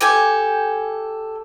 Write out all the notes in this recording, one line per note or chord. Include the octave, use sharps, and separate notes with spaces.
G4 A4 G#5